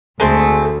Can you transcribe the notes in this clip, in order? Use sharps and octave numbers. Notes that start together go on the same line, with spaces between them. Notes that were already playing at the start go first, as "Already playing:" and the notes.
D2 G#3 A3 C4